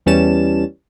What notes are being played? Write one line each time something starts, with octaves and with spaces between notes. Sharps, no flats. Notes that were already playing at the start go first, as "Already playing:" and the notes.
E2 E3 G3 C#4 A5 E7